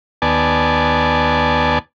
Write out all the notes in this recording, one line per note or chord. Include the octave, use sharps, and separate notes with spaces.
D#2 B3 D5 G#5 A5